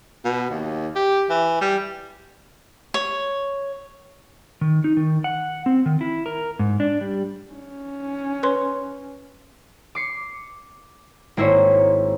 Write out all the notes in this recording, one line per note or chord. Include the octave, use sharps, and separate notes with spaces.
B2
D#2
G4
E3
G3
C#5
D#3
D#4
D#3
F#5
C4
D#3
E4
A#4
G#2
D4
G3
C#4
B4 C#5 C6
D6 C7 C#7
G#1 A#3 E4 C5 C#5